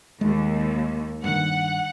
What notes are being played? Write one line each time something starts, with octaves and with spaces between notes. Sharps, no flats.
D#2 G#3
G2 D#3 F#5